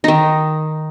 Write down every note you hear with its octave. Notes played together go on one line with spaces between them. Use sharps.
D#3 D#4